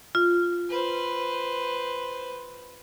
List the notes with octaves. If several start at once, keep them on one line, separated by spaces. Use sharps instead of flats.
F4
B4 C5